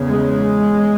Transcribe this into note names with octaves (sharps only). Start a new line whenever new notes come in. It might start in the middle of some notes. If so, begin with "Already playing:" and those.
Already playing: E2 C#3
G#3